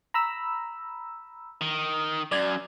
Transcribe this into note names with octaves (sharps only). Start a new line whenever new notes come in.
A#5 B5 E6
D#3
F#2 D5 G#6